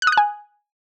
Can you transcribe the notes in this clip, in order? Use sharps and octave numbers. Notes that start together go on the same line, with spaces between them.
F#6
D#6
F#6
G#5